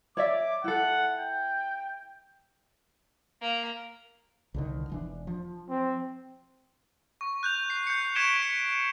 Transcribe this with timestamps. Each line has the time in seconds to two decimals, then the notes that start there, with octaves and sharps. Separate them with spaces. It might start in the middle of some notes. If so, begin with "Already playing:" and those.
0.17 C#5 D5 E5 D6
0.64 E4 A4 F#5
1.18 G5
3.41 A#3
4.54 C2 D3 D#3
4.90 E1 E3 D4
5.27 F3
5.69 C4
7.21 C#6
7.43 F#6 G6 F7
7.70 C7
7.87 G6 C7 C#7
8.15 C#6 G#6 B6 D7 E7 G7
8.42 B6 C#7